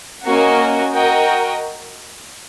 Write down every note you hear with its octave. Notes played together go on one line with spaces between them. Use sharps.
A#3 C#4 F#4 A#4 D#5
F#4 A#4 D#5 G5